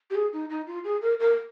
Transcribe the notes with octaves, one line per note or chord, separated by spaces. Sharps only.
G4
G#4
D#4
D#4
F4
G#4
A#4
A#4